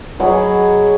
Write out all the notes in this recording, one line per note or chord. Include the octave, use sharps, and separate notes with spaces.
F#3 G#4 D#5 B5